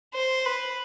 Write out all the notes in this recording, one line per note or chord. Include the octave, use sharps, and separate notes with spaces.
C5
B4